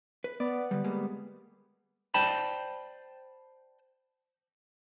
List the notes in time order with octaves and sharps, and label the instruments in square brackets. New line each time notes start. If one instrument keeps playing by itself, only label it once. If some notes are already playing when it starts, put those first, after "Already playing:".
[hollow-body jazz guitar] B4
[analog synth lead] B3 [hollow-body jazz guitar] D5
[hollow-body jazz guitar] D3 G3
G3 G#3 A#3
[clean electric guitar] C5 D5 G5 A5 B5